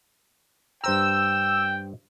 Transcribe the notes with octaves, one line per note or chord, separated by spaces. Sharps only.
G2 C5 G5 A#5 E6